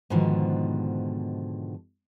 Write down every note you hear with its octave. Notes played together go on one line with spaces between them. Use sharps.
G#2 B2 D3 D#3 F3